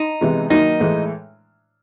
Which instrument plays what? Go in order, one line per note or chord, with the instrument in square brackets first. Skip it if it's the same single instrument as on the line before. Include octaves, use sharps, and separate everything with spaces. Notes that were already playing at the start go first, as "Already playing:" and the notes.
Already playing: [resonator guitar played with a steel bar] D#4
[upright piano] C3 E3 G#3 B3
[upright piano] D#3 F#3 A#3 [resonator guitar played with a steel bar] D#4
[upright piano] A2 E3 G#3